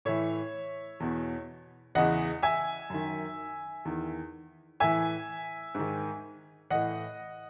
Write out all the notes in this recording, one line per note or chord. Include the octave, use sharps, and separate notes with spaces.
A2 E3 C#5 E5
E2 B2
E2 C#3 E3 D#5 F#5
E5 G#5
F#2 D#3
E2 D#3
A2 E3 E5 G#5
G#2 D#3
A2 E3 D#5 F#5